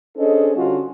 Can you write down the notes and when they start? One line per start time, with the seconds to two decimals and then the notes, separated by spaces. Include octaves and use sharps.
0.17 C#4 D4 G#4 A4 C5 D#5
0.56 D3 G3 C#4 F4 F#4